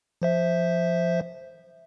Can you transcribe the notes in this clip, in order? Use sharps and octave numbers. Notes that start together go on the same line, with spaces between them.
F3 C5 E5